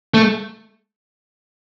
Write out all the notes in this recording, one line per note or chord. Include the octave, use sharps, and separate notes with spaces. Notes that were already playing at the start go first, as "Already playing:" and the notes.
A3